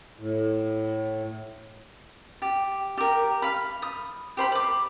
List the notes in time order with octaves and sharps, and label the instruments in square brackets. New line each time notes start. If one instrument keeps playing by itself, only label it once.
[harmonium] A2
[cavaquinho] G4
G4 A#4
F5 B5
D#6
G4 C5 B5
B5 D6